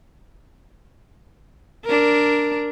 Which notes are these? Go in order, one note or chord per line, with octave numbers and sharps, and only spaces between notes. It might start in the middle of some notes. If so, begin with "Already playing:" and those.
D4 A#4